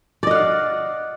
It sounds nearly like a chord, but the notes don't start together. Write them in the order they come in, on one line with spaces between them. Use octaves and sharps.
D5 D#5 F#5 F5